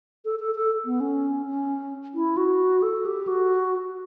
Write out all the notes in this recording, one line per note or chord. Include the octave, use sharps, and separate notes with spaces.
A4
A4
A4
B3
C#4
C#4
E4
F#4
A4
G4
F#4